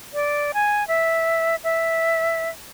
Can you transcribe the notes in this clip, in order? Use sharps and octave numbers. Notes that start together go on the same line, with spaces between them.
D5
G#5
E5
E5